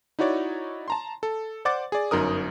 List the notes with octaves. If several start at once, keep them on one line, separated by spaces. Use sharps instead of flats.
D#4 E4 F#4 C#5 D5
A5 A#5 C6
A4
C5 D5 F#5 D6 A6
G#4 D5
G1 F#2 D#4 A#4 D#6